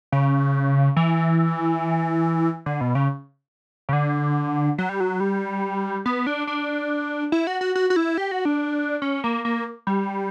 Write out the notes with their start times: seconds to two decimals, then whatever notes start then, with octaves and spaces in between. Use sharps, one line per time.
0.12 C#3
0.96 E3
2.66 D3
2.81 B2
2.95 C#3
3.89 C#3
3.93 D3
4.78 F#3
4.89 G3
5.00 F#3
5.20 G3
6.06 B3
6.27 D4
6.47 D4
7.32 E4
7.47 F#4
7.61 F#4
7.75 F#4
7.90 F#4
7.96 E4
8.18 G4
8.31 F#4
8.45 D4
9.02 C#4
9.24 A#3
9.45 A#3
9.87 G3